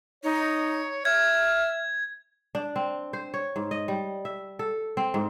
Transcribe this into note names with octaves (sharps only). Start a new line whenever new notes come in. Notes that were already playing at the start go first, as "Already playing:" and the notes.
D#4 C#5
E5 F6 G#6
D4
C4
C5
C#5
G#2
D#5
G3
E5
A4
C4
G#2